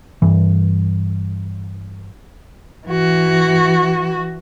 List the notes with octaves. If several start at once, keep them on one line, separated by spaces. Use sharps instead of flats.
G2 E3
E3 F#4